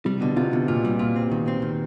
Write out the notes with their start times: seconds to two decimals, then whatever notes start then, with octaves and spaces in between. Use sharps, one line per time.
0.05 C3 G3
0.21 B2 D3
0.36 C3 F4
0.53 B2 D3
0.68 A#2 F4
0.85 G3
0.99 A#2 F4
1.16 C4
1.31 D#3
1.48 C4
1.62 D#3